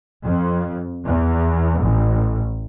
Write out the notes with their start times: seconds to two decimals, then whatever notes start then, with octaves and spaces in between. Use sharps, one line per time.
0.23 F2
1.05 E2
1.81 A1